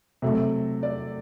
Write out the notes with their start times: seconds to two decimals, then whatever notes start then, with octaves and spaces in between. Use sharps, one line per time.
0.22 C3 F#3 A3
0.83 D5